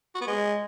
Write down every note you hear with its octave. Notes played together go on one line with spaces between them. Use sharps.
F#4
B3
G#3